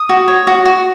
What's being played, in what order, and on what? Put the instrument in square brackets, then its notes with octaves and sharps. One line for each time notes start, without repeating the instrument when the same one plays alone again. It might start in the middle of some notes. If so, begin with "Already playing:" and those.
Already playing: [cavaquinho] D#6
F#4
C#5
F#4
F#4